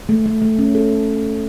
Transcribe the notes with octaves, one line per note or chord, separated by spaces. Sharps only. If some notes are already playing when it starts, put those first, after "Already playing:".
A3
A3
A3
C#4
A4